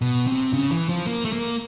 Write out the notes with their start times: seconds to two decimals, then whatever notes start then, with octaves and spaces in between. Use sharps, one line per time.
0.01 B2
0.27 C3
0.54 C#3
0.71 E3
0.89 F3
1.06 A#3
1.25 A3
1.33 A#3